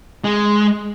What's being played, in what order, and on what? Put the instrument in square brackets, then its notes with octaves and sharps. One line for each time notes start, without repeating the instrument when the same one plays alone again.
[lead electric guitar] G#3